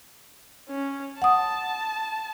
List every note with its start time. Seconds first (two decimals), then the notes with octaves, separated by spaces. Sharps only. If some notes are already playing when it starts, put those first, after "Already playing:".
0.68 C#4
1.22 F#5 A5 D#6